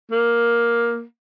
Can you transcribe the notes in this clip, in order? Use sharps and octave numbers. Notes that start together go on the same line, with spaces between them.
A#3